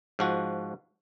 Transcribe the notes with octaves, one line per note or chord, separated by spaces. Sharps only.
G#2 F3 F#4